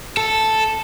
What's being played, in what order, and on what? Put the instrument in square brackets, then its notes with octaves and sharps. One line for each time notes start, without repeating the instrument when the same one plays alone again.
[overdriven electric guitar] A4